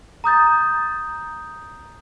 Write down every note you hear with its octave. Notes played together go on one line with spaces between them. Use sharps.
A#5 D#6 G6 A6